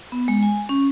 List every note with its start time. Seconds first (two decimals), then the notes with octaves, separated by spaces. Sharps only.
0.12 B3
0.28 G#3
0.43 G#5
0.69 C#4